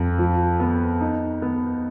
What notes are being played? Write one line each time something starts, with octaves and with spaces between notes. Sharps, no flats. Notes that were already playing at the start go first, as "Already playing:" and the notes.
Already playing: F2
F3
B3
D#4
B3